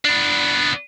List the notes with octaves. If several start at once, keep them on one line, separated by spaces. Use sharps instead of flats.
B3 D4